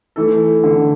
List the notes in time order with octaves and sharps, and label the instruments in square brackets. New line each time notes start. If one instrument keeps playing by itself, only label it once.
[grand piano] E3 A3 E4 A4
[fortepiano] D3